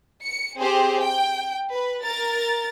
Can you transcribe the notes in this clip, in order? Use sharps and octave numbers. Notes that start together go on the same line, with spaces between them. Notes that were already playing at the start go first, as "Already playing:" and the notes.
C#7
C4 G4 G#4 C5
G5
B4
A#4 A6